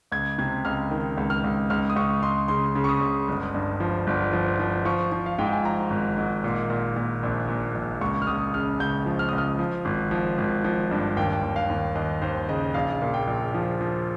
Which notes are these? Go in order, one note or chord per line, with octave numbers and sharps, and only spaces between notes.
C#2 G#6
C3 G#6
C#2 F6
D#3
C#2
F6
C#2
C#2 F6
D#6
C#2 C#6
C#2 C6
C#3 C6
C#3
C#6
D#6
C#2
G1
G2
F3
G1
F3
F3
F3 C#6
F3
F5
G#2 G5
G#5
F3 A#5
G#1
G#2
A#2
A#2
A#2
A#1
A#2
A#1
C#2 C#6
F6
C#2 D#6
C#3 F6
C#2 G6
F3
F6
C#2 D#6
F6
F3
G#1
F3
G#1
F3
G2
D#2 G5
D#2
F5
D#2
D#2 D#5
D#2 C5
C#3 D#5
A#1 F5
A#2
G5
A#1
F3
F3